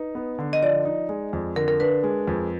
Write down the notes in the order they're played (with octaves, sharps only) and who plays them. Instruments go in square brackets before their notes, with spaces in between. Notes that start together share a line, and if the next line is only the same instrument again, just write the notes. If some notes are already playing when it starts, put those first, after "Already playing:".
Already playing: [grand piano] D#4 [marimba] B4
[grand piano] B3
D3
[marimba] D#5
[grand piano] F3 [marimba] D5
[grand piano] D#4
G#3
F2
[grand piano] D3 [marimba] A#4
[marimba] A#4
[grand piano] D4 [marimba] B4
[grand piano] G#3
F2